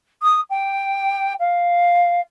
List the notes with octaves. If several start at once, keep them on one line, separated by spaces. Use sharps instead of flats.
D#6
G5
F5